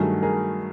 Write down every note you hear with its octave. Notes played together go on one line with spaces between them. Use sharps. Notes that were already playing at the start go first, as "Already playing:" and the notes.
Already playing: G2 D#3 F#3 A3 F#4 G#4
G#4 A#4